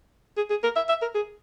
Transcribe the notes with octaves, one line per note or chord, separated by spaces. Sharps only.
G#4
G#4
A#4
E5
E5
A#4
G#4